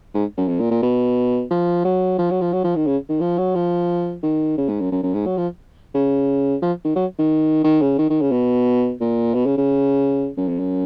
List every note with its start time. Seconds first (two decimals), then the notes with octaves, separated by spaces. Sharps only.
0.15 G#2
0.38 F#2
0.48 F2
0.60 A#2
0.71 A#2
0.83 B2
1.51 F3
1.85 F#3
2.19 F3
2.31 F#3
2.41 F3
2.53 F#3
2.64 F3
2.76 D#3
2.87 C#3
3.09 D#3
3.21 F3
3.38 F#3
3.55 F3
4.23 D#3
4.58 C#3
4.69 G#2
4.80 F#2
4.92 F#2
5.03 F#2
5.14 G#2
5.26 F#3
5.37 F3
5.94 C#3
6.62 F3
6.85 D#3
6.96 F#3
7.19 D#3
7.64 D#3
7.82 C#3
7.99 D#3
8.10 D#3
8.21 C#3
8.32 B2
9.01 A#2
9.34 B2
9.46 C#3
9.58 C#3
10.37 F#2
10.49 F2
10.59 F#2